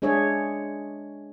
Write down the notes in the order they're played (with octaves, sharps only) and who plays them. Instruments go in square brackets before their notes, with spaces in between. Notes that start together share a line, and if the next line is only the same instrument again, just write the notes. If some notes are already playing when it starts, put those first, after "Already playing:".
[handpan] G#3 D4 G#4 C#5 E5